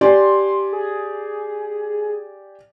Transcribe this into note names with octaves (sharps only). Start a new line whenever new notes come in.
G4 D5 G#5 C6
G#4